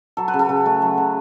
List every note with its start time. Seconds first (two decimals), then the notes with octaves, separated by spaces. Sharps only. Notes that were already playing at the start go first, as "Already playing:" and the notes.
0.17 F#3 A4
0.28 B4
0.34 C#3
0.39 A4
0.49 C#3
0.66 A3
0.82 F#3
0.98 C#3